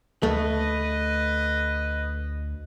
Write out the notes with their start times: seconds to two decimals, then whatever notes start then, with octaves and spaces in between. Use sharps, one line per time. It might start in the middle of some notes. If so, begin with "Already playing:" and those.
0.23 D2 A3 B4 D#5